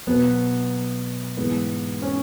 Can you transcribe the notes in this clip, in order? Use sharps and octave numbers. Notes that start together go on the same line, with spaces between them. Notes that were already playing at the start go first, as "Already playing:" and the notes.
B2 F#3 B3
G#2 E3 G#3 B3
C#4